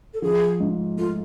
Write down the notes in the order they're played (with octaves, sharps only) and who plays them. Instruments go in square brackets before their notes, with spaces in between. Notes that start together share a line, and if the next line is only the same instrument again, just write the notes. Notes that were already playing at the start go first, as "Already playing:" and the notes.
[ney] A4
[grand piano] F3 [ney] G#4
[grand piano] G#2
[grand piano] A3 [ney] F4